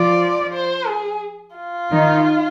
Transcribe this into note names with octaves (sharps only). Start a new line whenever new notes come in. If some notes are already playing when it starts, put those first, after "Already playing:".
Already playing: F3 F4 D5
C5
G#4
F4
D#3 D#4